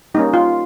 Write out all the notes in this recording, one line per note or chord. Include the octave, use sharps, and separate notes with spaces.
G3 A#3 C#4 D#4
F4